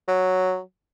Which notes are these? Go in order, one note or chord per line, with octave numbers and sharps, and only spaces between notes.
F#3